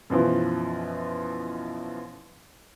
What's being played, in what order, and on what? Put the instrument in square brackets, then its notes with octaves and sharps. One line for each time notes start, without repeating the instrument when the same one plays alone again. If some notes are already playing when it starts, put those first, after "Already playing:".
[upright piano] F#2 B2 E3 F3